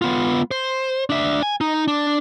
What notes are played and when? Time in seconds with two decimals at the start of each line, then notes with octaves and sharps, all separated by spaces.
0.02 B3 F4
0.51 C5
1.10 D4 E5
1.42 G#5
1.61 D#4
1.88 D4